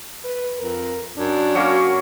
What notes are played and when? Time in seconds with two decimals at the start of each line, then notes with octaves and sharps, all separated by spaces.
0.24 B4
0.59 F2 A#4
1.17 F#2 D4
1.55 F#3 A#3 C#4